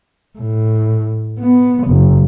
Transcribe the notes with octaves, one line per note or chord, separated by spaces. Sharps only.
A2
B3
F#1